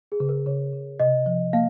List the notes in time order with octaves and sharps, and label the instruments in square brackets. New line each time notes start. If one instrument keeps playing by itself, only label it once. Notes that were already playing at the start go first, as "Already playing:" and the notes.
[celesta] G#4
[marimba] C#3
[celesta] A#4
[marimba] C#3 [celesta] C#5
[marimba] C#3
[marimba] C3 [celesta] D#5
[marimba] F3
[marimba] A#3 [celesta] F5